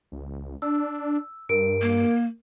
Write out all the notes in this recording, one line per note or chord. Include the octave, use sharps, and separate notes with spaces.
C#2
D4 E6
G2 A#4 D7
A#3